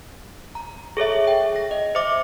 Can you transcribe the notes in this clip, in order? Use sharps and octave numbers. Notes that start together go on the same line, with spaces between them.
A#5
G#4 A4 C#5 E5
G5
A#6
D#5
C5 E5 D6